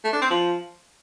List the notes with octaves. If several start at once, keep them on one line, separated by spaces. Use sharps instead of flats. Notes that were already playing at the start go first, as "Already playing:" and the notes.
A3
D4
C4
F3